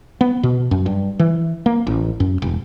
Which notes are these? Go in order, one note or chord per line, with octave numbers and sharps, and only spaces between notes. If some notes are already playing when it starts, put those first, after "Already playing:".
B3
B2
F#2
G2
E3
A#3
A1
F#2
E1